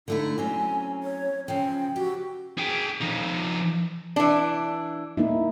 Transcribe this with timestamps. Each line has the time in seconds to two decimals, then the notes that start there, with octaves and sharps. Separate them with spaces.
0.08 D3 A3 D#4 E4
0.38 F#3 C4 C#4 G#5
1.03 C#5
1.48 C#3 F3 G5
1.96 F#4 G4
2.58 G#4 G5
3.02 F3 D#4
4.16 E3 D4
5.17 A#3 D#4 E4